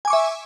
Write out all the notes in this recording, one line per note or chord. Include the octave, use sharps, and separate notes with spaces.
E5 G#5 C#6 D6